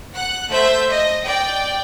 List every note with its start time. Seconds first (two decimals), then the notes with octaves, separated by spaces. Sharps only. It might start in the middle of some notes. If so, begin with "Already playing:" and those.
0.15 F#5 F#6
0.51 A3 C5 E5 G6
0.90 D#5
1.25 D5 G5